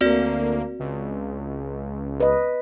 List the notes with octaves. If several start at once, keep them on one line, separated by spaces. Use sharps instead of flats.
D2 A#3 C4 F#4 D5
C#2
B4 D#5